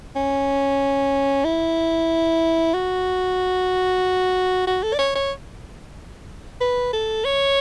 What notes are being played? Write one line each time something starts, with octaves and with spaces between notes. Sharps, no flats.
C#4
E4
F#4
F#4
A4
D5
C#5
C#5
B4
A4
C#5